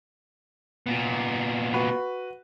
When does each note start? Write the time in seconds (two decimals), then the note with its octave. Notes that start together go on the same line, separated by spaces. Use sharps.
0.86 A#2 B3
1.74 F#4 B4